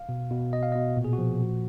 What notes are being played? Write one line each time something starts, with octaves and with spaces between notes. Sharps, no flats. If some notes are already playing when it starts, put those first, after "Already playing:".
Already playing: F5
B2
B2
B2 D#5
F5
B2 D#5
A#2 F#4
G#4
F#4
F3
A#2